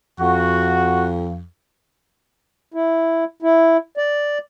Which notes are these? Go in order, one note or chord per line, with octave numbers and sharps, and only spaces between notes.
F2 F#4
E4
E4
D5